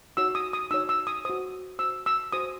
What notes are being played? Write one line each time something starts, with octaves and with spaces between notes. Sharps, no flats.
D#4 F#4 C#5 E6
D#6
D#6
D#4 F#4 C#5 E6
E6
D#6
F#4 C5 D#6
F#4 C5 E6
E6
F#4 C5 D#6